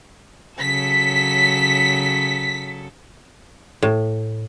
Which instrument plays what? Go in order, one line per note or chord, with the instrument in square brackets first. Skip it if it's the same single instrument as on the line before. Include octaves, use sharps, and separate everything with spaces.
[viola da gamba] C#3 F#3 A4 [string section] B6
[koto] A2